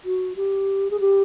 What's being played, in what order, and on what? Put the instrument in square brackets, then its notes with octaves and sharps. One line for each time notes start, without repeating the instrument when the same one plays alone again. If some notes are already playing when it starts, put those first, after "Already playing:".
[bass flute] F#4
G4
G#4
G4